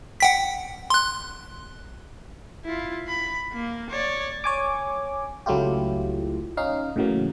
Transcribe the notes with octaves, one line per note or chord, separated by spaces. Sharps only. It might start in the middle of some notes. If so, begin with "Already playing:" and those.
F#5 G5 B6
C6 F#6
E4 F4
B5
A#3
C#5 D5
C#5 G#5 D6
C#2 F#3 A3 E4 F4 G4
C#4 D#4 F5
A2 C#3 E3 F#3 A#3